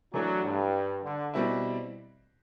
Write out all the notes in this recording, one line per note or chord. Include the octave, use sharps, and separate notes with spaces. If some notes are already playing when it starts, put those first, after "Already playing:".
E3 F#3 A3 D4
G2
D3
B2 G3 C4 E4